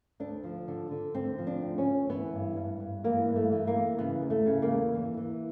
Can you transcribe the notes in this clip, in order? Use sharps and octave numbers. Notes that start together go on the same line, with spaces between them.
D2 D4
F3
D3
D3
D2 C4
F3
D4
D2
C#4
D2
E3 B3
G2
G2
G2
E3 A#3
G2
A3
E3
A#3
E3
C#3 B3
E2
A3
C#3
A#3
E2
E3
E3